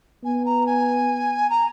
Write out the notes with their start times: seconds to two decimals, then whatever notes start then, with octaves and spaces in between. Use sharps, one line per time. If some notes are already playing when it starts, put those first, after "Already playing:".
0.24 B3 G#5
0.45 A#5
0.66 G#5
1.49 A#5